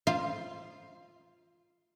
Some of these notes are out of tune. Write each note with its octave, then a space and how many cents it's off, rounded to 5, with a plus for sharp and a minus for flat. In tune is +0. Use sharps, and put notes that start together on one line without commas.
F4 +0 C5 +10 F5 -25